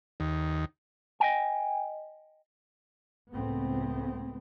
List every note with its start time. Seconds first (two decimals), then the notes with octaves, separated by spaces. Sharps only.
0.20 D#2
1.20 D#5 E5 G5 G#5
3.31 C#2 A2 A3 B3 C4